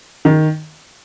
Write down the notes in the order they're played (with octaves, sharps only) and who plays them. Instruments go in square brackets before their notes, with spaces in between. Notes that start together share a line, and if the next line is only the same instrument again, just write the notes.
[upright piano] D#3